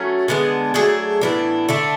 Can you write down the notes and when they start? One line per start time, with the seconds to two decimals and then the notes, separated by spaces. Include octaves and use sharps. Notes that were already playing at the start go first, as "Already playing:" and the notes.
Already playing: F#3 A3 C#4
0.28 D3 G#3 B3 D4
0.74 F#3 A3 D4 G#4
1.21 A2 E3 B3 D4
1.69 D3 A3 D4